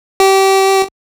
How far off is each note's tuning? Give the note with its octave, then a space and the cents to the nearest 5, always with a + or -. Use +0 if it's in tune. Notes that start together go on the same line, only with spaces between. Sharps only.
G4 -25